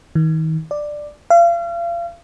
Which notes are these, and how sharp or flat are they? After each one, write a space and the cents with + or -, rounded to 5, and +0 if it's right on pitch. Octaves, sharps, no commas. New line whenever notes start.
D#3 +35
D5 +10
F5 -35